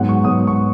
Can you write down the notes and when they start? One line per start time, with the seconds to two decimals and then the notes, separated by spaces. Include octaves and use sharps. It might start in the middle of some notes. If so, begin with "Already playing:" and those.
Already playing: G#2 F#3 B3 F#5
0.09 C#6
0.24 G#2 F#3 B3 D#6
0.47 C#6